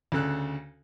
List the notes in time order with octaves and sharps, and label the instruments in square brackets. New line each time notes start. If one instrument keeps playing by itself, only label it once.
[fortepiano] D2 C#3 A4 F#6